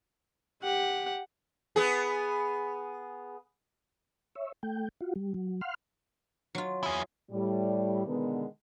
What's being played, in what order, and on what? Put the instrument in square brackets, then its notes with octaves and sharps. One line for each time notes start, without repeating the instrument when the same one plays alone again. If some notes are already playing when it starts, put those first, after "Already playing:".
[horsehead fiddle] G4 [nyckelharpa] F#5
[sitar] B3 G#4
[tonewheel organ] C#5 E5
A3 G5
F4 F#4
G3
F#3
F5 F#5 C6 F6
[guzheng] F#3 F4
[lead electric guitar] E4 G#4
[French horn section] A2 G3
B2 D3 D#3 G#3 B3